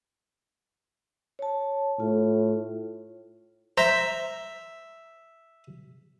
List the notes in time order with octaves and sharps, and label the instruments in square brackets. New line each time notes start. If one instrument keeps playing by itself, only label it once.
[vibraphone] C#5 A5
[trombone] A2 [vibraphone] F4
[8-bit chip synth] C5 A#5 [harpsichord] E5